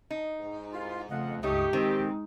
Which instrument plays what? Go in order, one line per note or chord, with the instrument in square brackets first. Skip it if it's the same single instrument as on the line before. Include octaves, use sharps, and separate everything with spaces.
[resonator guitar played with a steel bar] D#4
[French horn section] G#2
[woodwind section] C2 E4 F4
[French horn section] F2 [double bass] C#3 A3 [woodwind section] F4 D#5 F#5
[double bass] C#2 G2 [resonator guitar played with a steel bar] A3 D#4 [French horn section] G4 [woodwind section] C#6 D#6
[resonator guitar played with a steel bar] D#3 [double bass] G#3 D#4 [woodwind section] C4